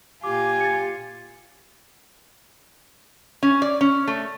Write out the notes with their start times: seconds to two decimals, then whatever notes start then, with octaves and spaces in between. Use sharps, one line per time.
0.24 A#2 F4 G4 G#5 D6
0.60 A6 C#7
3.43 C#4
3.62 D5
3.81 C#4
4.08 A3